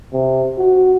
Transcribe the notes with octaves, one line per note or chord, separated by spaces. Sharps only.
C3
F#4